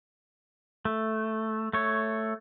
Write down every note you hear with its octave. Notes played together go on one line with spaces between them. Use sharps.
A3
A3 C#5